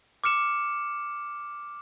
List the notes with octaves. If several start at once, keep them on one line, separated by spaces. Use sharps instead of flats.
D6 F6 C#7 E7